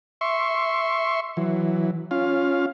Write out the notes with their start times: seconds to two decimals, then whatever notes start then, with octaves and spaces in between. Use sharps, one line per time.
0.21 E5 C6 C#6
1.37 E3 F#3
2.11 C#4 F4 F5